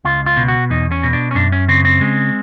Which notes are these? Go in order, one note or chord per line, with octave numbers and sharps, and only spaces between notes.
C#2 F4
F4
B2
F#4
E2 D#4
C#4
B2
D4
C#4
F#2 D4
C#4
C#3 C4
C4
G#3